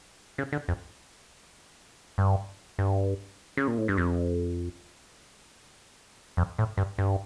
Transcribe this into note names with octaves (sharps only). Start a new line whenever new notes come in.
C#3
D3
F2
G2
G2
C#3
A#2
A2
G2
F2
F2
A2
G2
G2